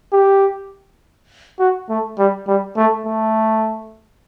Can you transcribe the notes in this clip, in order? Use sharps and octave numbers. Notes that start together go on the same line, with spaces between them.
G4
F#4
A3
G3
G3
A3
A3